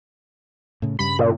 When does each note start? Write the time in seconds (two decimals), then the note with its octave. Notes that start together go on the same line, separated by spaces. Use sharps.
0.82 A2 C#3
0.99 G2 C#3 G3 B5
1.19 A#2